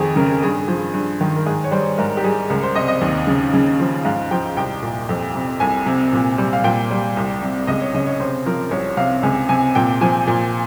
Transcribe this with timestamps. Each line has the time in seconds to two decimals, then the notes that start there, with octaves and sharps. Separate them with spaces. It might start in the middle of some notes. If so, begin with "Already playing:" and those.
Already playing: F2 D#3 G#4
0.16 C#3 A#4
0.43 G2 G#4
0.68 F3
0.94 G2
1.21 D#3
1.36 A#4
1.46 G#2 G#4
1.64 C#5
1.71 G3 C5
1.98 G#2 A#4
2.17 G4
2.24 G3 G#4
2.50 C#2 A#4
2.63 C5
2.75 C3 D#5
2.88 D#5
3.01 D#2
3.27 C#3
3.53 C#3
3.80 F3
4.05 G#2 F5
4.31 F3 G5
4.57 C2 G5
4.83 A#2
5.09 F2
5.35 C3
5.60 C2 G#5
5.86 C3
6.13 A#2
6.38 G3
6.53 F5
6.64 A#2 G5
6.91 G3
7.17 C2
7.42 C3
7.67 C#2 D#5
7.81 C#5
7.94 C#3 D#5
8.06 C#5
8.20 C3 C5
8.46 F3 A#4
8.71 C2 C#5
8.97 C3 F5
9.23 C#2 G#5
9.49 C3 G#5
9.75 A#2 G5
10.01 F3 G#5
10.27 A#2